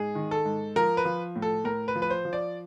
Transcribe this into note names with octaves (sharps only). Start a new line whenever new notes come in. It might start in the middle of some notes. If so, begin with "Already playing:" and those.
Already playing: G#2 G#4
D#3
A4
G#2
F3 A#4
B4
F3
A2
A4
A2 A#4
B4
F3
B4
C5
F3
D5